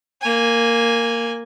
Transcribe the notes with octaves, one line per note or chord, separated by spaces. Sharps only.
A#3 G#5